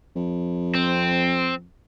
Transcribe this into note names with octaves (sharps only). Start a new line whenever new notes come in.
F2
C4